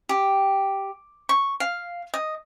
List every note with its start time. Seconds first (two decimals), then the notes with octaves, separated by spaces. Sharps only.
0.09 G4
1.29 C#6
1.60 F5
2.14 D#5